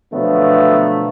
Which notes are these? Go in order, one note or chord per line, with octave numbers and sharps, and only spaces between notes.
B2 D3 F3 F#3 A3 B3